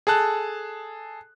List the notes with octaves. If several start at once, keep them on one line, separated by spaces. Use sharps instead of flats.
G#4 A4 A5 F#6